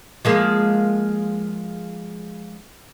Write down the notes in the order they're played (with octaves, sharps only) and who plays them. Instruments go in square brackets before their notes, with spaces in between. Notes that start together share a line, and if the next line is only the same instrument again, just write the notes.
[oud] F3 G#3 A#3